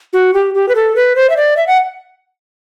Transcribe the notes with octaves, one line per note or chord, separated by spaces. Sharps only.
F#4
G4
G4
B4
A4
B4
C5
E5
D5
E5
F#5